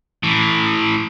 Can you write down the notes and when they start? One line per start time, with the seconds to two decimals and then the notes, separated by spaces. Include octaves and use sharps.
0.23 A2 E3